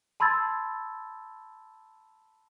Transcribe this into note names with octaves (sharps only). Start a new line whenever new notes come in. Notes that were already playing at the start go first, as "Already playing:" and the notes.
A5 B5 C6 E6 G#6 A6